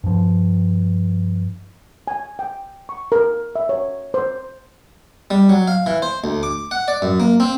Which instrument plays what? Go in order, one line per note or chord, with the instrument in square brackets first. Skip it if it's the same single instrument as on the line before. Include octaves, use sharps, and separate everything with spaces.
[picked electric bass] G2 F3
[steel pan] G#5
G5
C#6
A#4
E5
C#5
C5
[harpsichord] G3
F#3
F5
E3
C5
D2
D6
F#5
D5
F#2
A#3
C4